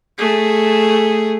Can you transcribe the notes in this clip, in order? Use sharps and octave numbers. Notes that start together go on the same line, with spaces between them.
A3 G#4